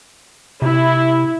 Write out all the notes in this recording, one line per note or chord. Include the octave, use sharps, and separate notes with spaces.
C3 E4